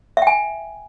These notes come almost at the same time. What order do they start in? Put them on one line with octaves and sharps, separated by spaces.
E5 G5 G#5